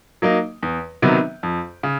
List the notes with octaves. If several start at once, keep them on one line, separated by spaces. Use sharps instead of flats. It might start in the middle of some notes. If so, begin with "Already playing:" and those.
F#3 A#3 D#4
E2
C3 D#3 F#3 B3
F2
C#3